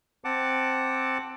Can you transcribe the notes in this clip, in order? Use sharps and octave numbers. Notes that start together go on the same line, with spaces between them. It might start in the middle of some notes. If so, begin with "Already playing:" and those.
C4 F#5 A5 D6